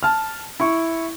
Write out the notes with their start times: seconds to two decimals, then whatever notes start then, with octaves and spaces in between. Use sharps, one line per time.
0.03 A5 F6
0.60 E4 C#6